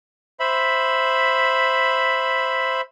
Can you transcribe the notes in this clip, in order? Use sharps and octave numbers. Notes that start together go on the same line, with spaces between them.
C5 E5 B5